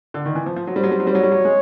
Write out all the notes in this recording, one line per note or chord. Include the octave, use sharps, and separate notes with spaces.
D3
D#3
E3
F3 C5
F3
F#3
G3
F#3 C5
G3
F#3
G3
F#3 C#5
G3
F#3
G#3